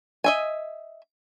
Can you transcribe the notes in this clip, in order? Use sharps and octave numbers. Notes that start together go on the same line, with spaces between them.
D#5 E5 G#5